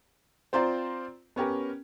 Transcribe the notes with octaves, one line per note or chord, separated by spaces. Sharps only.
C4 F4 C5 D5 A#5
B3 C#4 G4 A#4